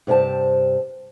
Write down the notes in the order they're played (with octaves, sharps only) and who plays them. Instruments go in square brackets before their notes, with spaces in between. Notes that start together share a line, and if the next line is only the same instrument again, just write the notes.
[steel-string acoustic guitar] G2 C3 C4 G#5 A5